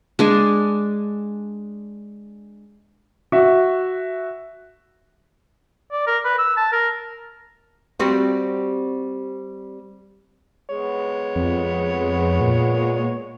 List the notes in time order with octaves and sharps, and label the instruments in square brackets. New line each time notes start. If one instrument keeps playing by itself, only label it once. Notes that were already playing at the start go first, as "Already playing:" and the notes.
[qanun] G#3 D4 G#5
[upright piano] F#4 E5
[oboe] D5
A#4
B4
E6
A5
A#4
[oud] G3 C4 F#4
[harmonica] G#3 B3 C#5
[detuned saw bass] F2
A#2